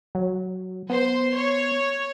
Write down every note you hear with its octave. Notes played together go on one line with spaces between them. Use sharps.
F#3
B3 C5 C6
C#5